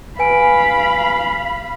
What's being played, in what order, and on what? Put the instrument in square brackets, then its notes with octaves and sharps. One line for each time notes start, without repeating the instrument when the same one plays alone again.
[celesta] B4 G#5 D7 [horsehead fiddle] F5 B5